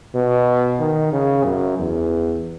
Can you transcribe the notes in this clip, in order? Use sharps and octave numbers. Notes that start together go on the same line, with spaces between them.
B2
D#3
C#3
F#2
E2